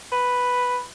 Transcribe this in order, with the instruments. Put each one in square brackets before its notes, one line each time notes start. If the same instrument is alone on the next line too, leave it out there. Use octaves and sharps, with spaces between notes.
[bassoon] B4